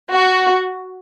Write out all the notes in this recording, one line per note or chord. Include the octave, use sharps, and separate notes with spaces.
F#4